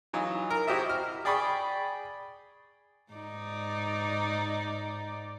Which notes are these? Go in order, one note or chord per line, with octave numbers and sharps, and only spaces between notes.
E3 F#3 D#4 F4
A#4
E4 F#4 G4 C5 D#5 E5
F6
G#4 D5 G5 B5 C#6 D#6
G#2 D#4 D5